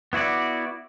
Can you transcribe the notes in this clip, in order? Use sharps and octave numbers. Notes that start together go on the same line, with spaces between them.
B3 E4 F#4 D5